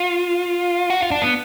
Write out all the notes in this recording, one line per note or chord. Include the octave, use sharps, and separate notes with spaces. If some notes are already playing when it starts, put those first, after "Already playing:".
Already playing: F4
F#4
F4
D4
B3